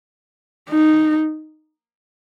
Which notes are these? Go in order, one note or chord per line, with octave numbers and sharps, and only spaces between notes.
D#4